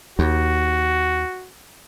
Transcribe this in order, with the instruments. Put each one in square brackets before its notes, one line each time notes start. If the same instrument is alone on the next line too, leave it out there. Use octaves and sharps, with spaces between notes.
[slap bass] D#2 [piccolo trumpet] F#4